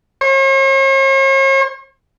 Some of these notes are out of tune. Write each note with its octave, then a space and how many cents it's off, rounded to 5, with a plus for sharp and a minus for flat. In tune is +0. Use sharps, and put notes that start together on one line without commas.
C#5 -45